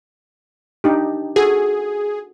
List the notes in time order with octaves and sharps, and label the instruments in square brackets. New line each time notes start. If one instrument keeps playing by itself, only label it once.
[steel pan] D4 D#4 G4
[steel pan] F#4 A4 [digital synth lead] G#4